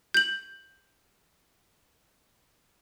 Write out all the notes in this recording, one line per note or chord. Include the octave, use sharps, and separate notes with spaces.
G6 F#7